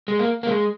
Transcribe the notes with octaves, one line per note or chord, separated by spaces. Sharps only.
G#3
A#3
A#3
G#3